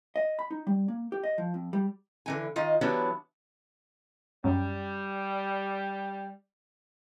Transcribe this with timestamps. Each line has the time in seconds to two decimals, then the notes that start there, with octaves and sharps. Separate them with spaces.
0.16 D#5
0.39 B5
0.51 D#4
0.67 G3
0.88 A#3
1.12 G4
1.24 D#5
1.38 F3
1.54 F2
1.73 G3
2.26 D3 E3 G#5
2.56 D#3 F4 D#5
2.81 E3 F#3 B3 D4 E4 G4
4.44 F#2 G3